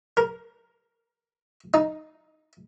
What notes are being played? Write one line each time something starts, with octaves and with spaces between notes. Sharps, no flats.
A#4
D#4